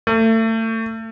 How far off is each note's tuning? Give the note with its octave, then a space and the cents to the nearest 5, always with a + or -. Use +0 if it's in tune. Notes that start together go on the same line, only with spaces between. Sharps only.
A3 +30